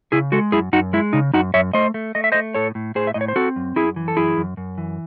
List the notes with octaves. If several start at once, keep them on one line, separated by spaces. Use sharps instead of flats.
C#3 E4 G#4
G#3 F#4 A4
F#2 E4 G#4
F#2 D#4 F#4
G#3 E4
C#3 D#4
F#2 D#4 F#4
F#2 C#5 E5
A3 C5 D#5
A3
A3 D#5
E5
A3 C5 D#5
A2 A4 C#5
A2
A2 G#4 C5
E5
A2 D#5
C#5
C5
C4 F#4 A4
F#2
F#2 E4 G#4
E3
A4
F#2 E4 G#4
F#2
F#2
E3